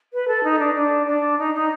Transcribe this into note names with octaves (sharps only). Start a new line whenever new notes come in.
B4
A4
D#4
D4
D4
D4
D#4
D#4